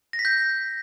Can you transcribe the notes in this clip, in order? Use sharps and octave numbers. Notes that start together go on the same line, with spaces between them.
A#6
B6
G6